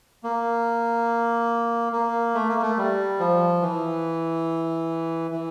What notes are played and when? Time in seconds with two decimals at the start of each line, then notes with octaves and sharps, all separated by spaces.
0.24 A#3
1.93 A#3
2.35 A3
2.49 A#3
2.62 A3
2.77 G3
3.19 F3
3.62 E3
5.31 E3